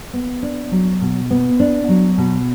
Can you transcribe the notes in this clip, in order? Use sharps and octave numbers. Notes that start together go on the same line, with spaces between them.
B3
D4
F#3
B2
B3
D4
F#3
B2